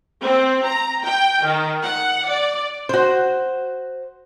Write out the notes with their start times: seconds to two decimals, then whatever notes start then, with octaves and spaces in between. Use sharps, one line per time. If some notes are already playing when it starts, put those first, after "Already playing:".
0.23 C4
0.65 A#5
1.03 G5
1.45 D#3
1.83 F#5
2.28 D5
2.89 F#4 C5